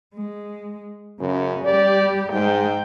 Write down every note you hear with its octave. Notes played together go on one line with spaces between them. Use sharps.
G#3
F#2 C#3
G3 G4 D5
G#2 G#3 G5